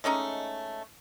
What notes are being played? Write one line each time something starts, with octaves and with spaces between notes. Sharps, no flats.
G#3 A3 C#4 D#4